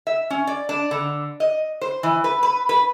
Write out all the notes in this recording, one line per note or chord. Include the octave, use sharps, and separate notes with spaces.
E5
C#4
D5
D4
D3
D#5
C5
E3
B4
B4
B4